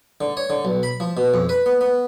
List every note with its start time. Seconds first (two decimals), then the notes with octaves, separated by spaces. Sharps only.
0.21 D3
0.37 C#5
0.50 D3
0.65 B1
0.83 B5
1.00 F3
1.17 B2
1.34 F2
1.49 B4
1.66 B3
1.81 B3